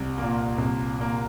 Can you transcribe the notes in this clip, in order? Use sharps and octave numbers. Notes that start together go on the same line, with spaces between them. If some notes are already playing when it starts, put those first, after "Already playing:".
Already playing: C2
A#2 A#3
C2
A#2 A#3